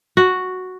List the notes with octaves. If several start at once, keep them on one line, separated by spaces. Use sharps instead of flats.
F#4